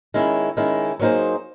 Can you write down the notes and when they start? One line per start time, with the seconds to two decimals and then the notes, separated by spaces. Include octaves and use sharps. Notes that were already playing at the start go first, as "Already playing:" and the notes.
0.14 D#3 G#3 C#4 E4
0.57 D#3 G#3 C#4 E4
0.99 F#3 A#3 D#4 G#4 C5